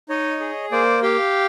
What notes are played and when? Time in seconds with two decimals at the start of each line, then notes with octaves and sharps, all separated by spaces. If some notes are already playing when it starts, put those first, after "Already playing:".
0.09 D#4 C#5 D#5
0.40 G#4
0.72 A#3 C5 D5
1.02 G4 F5 G5